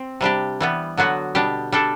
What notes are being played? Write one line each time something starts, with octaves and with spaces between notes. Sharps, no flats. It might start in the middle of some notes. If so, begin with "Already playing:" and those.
Already playing: C4
C3 G3 D4 G4
E3 G3 B3
D3 F#3 B3 F#4
B2 G3 D4 G4
G3 D4 A4